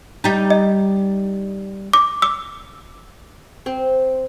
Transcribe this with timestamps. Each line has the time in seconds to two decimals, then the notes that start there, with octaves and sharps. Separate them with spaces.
0.24 G3 D#4
0.50 D#5
1.93 D6
2.22 D6 E6
3.66 C4